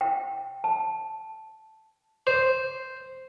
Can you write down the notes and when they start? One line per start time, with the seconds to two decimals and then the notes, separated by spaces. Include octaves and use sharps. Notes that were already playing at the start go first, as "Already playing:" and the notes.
0.01 G5
0.64 A5
2.27 C5